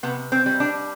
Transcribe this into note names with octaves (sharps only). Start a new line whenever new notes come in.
C3 B3
C4
G3
D4